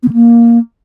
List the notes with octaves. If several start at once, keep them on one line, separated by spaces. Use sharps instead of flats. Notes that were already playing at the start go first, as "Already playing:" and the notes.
B3
D3
A#3